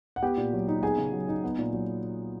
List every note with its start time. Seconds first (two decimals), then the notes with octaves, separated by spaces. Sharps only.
0.16 F#5
0.22 B3 G4 G5
0.37 A#2
0.53 F#3
0.68 D#4
0.83 B3 G#4 G#5
0.98 C#3
1.13 F#3
1.28 D#4
1.44 B3
1.58 A#2
1.73 F#3